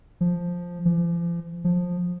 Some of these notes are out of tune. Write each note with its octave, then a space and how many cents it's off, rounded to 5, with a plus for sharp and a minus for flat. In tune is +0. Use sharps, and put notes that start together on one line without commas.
F3 +5
F3 -40
F3 +15